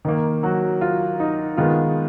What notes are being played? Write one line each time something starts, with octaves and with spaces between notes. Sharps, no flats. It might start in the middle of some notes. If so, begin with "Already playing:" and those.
D#3 A#3
F#3 F#4
F4
D#4
D#3 G#3 B3 F4